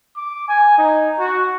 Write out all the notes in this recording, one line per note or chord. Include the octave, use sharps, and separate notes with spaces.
D6
G#5
D#4
F#4